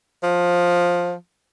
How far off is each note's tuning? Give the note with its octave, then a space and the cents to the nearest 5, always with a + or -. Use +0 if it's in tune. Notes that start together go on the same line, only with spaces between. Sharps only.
F3 +10